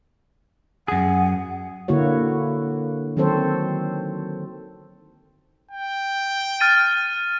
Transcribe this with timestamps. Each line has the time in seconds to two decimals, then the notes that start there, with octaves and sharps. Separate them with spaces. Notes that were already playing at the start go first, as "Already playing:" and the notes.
0.88 F#2 G#4 F#5
1.88 D3 A#3 E4 F#4 C#5
3.17 D#3 F#3 C4 A4 C5 C#5
5.71 G5
6.60 F6 A6 D#7